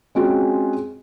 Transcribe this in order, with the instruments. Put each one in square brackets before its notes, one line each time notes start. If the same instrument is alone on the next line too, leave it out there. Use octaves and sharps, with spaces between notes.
[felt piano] G#3 C4 C#4 F4 F#4 G#4